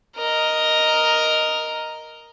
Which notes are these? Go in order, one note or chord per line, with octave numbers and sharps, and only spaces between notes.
A#4 D#5